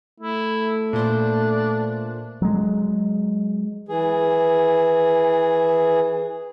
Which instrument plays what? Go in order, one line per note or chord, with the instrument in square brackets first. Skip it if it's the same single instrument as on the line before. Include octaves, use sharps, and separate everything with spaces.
[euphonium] A3 [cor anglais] E4
[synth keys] A#2 C5 [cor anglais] D4
[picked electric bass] F#3 G#3
[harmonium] E3 G#4